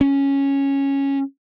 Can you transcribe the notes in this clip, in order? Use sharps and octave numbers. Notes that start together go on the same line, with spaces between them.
C#4